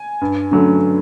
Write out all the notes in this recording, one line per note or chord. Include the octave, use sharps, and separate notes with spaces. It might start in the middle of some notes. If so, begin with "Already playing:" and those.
Already playing: G#5
G2
D3 F#3 A3 C#4